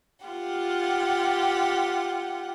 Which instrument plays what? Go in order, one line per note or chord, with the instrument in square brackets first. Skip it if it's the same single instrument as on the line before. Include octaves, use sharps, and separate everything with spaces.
[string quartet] F4 G4 F#5